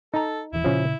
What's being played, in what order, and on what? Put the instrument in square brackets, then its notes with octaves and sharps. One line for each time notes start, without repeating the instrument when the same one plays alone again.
[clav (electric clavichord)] D#4 A#5 [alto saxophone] A4
[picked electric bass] D#1 E3 [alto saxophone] E4
[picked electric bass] A#2 C#3 [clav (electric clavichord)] F3 C#4